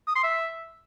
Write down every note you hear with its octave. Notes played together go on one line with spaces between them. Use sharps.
D#6
C6
E5